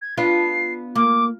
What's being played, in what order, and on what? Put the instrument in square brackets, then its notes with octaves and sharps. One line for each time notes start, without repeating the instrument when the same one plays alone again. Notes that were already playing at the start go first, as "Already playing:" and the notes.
[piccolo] G#6
[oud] B3 D4 F4 [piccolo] C7
[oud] A#3 [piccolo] D6